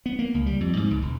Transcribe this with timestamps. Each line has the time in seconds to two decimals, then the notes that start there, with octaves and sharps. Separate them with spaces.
0.06 B3
0.19 A#3
0.34 C#2
0.46 G3
0.61 F2
0.77 G#2
0.90 C#2
1.02 E1